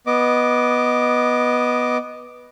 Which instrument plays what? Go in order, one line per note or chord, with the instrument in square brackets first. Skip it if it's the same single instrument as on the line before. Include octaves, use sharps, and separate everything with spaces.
[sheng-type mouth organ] B3 D#5 D6